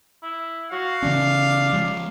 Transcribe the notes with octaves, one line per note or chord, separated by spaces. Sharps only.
E4
F#4 F5
C#3 E3 C#4 D4
F3 G#3